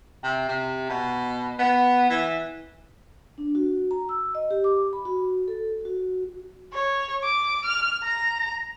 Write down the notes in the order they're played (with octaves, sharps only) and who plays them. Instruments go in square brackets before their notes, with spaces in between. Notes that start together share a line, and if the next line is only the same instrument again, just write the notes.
[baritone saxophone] C3
C3
B2
B3
E3
[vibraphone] D4
F#4
A#5
E6
D#5
G4
D6
B5
F#4
A4
F#4
[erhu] C#5
D6
F6
A#5